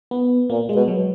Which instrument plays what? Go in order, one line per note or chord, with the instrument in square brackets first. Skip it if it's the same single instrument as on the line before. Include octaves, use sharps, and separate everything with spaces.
[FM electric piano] B3
[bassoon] A#2 [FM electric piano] A#3
[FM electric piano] G#3
[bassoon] B2
[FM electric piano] F#3